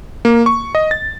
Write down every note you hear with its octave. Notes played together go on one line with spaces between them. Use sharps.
A#3
C#6
D#5
A6